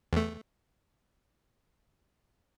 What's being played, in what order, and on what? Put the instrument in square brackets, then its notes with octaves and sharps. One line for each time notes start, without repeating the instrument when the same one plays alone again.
[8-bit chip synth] E2 A3